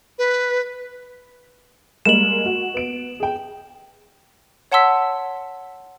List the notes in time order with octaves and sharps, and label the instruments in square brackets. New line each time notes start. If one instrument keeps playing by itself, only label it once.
[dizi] B4
[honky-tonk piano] G3 G#3 A#3 [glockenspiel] E7 F#7
[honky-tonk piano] F#4
B3 D7
G#4 G5
[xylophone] C#5 F#5 A5 C6 E6 B6